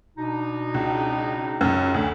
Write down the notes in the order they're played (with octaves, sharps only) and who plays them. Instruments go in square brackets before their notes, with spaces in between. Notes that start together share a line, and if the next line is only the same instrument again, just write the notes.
[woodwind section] B2 D4 D#4
[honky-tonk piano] C#2
C#2 F#2
D2